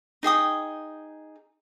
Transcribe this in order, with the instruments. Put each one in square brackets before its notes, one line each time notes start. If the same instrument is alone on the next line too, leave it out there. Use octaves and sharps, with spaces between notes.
[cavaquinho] D#4 G#4 G5 D#6